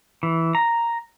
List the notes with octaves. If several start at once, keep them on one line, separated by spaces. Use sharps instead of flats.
E3
A#5